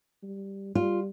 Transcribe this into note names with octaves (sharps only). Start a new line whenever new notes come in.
G3
G3 F4